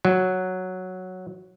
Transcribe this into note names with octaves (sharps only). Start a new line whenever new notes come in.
F#3